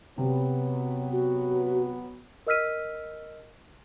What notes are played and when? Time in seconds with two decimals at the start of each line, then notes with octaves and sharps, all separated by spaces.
0.18 C3 F#3 B3
1.12 F#4
2.47 A#4 D#5 E6 F6 B6 D#7